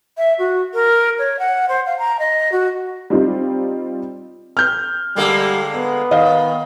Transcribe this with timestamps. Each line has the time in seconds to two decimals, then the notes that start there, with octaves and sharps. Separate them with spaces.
0.17 E5
0.39 F#4
0.74 A#4
1.18 C#5
1.39 F#5
1.69 C5
1.86 F5
1.99 A#5
2.19 D#5
2.52 F#4
3.10 G3 C4 D#4 F4
4.57 F6 G6
5.16 D3 G3 G#3 A#3
5.75 B3
6.11 D#3 D#5 F5